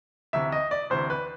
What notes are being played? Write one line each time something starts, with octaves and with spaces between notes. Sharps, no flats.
D2 C3 E3 E5
D#5
D5
D2 C3 E3 C5
B4